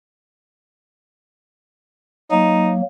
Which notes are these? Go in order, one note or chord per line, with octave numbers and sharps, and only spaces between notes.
F#3 A#3 D#4